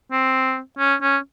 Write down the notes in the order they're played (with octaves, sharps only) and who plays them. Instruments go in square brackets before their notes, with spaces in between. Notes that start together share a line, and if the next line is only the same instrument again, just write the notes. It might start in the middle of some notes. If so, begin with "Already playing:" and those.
[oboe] C4
C#4
C#4